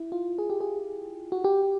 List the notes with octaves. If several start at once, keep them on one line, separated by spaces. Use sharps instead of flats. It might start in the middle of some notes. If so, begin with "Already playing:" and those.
Already playing: E4
F4
G#4
G4
G#4
F#4
G4